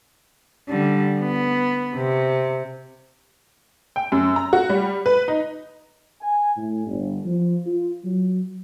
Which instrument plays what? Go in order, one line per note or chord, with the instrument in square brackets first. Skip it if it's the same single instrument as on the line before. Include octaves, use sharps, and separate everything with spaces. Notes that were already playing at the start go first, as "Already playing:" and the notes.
[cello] D3 G3
B3
C3
[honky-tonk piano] G5
F#2
A#5
F#4
G3
B4
D#4
[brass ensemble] G#5
A2
G1
F3
F4
F#3